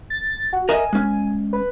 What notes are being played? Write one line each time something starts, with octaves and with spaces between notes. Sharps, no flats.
A6
F#4
A#4 D#5 E5 G#5
G#3 C#4
B4